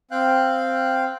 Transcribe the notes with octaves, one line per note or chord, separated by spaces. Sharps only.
C4 F5 G5 F#6